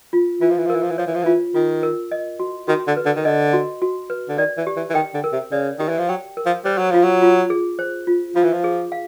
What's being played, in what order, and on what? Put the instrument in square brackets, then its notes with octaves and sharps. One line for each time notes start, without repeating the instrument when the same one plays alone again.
[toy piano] F4
[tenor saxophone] E3 [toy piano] F4
[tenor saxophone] F3
E3
F3
[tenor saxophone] E3 [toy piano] A#4
[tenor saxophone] F3
E3
[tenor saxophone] F3 [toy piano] C#5
[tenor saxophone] E3
F3
[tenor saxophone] E3 [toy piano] F4
[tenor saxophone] D#3 [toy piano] F4
[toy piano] A#4
D#5
F#4
[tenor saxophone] D#3 [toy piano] F#4
[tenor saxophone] D3
[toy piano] B4
[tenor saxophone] D3
D#3
[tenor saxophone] D3 [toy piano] D#5
[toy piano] F#4
F#4
B4
[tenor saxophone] D3
[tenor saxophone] D#3 [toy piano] D5
[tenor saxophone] E3
[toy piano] G4
[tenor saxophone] E3
E3
[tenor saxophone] D#3 [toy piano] G5
[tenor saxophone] D3
[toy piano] A#4
[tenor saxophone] C3
[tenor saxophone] C#3 [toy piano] D5
[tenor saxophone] D#3 [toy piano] G4
[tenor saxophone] E3
F3
[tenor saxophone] F#3 [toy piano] G5
[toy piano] A#4
[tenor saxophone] F3
[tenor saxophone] G3 [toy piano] C5
[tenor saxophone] F#3
[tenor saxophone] F3 [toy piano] F4
[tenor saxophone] F#3
[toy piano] F4
G#4
C5
F4
[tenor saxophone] F3 [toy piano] F4
[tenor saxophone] E3
F3
[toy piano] G#4
F5